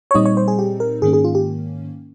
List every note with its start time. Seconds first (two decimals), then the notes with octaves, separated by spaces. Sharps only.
0.11 C#5
0.14 A#2 G3 C4 D#4 D#5
0.25 C#5
0.37 C5
0.48 G#4
0.59 G4
0.80 A#4
1.02 G#2 D#3 A#3 C#4 G#4
1.13 G#4
1.24 F4
1.35 G4